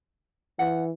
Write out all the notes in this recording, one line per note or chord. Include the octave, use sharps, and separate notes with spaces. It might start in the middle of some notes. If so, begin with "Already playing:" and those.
E3 F#5